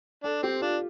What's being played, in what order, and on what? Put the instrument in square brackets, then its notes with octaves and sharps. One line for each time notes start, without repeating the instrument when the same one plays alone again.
[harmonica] D4 [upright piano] A4
[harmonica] C4 [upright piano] G4
[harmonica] D4 [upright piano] F4